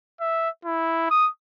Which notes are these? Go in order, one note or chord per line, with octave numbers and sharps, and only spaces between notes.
E5
E4
D#6